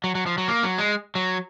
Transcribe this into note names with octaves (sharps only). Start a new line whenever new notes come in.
F#3
F#3
F3
F#3
A#3
F#3
G#3
F#3